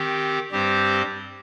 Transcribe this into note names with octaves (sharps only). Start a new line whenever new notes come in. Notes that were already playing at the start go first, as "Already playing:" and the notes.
Already playing: D#3 C4 G4
G2 G3 C4 G4 C5